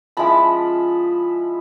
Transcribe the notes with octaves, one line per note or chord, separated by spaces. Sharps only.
F3 G#3 C#4 E4 A5 B5